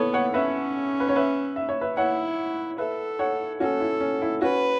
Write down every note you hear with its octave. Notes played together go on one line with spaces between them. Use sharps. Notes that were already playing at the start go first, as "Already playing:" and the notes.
Already playing: B3 E4 A4 C#5
C#5 F#5
C#4 B4 E5
B4
C#5
B4 E5
E5
C#5
B4 E5
E4 C#5 F#5
A4 B4 E5
C#5 F#5
C#4 F#4 A4
E4
C#4
E4
C#4 F#4 B4